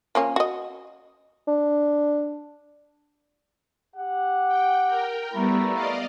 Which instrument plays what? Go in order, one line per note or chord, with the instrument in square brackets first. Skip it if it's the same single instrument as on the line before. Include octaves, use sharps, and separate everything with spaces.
[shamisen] F3 A#3 C#4
F#4 D#5
[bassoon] D4
[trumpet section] G4 F#5
[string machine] G5
A#4 G5
[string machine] G3 B3 [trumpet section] A3 E4 A#5
[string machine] D5 D#5 F5